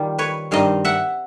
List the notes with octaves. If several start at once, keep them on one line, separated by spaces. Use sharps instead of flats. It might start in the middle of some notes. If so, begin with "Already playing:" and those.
Already playing: D#3 G3 F4
B4 C#5
G2 D#3 G3 C4 D#4 D#5 F5
E5 F#5